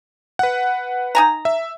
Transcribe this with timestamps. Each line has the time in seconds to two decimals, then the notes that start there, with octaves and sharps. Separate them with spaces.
0.39 B4 F#5
1.15 D#4 G#5 A#5
1.45 E5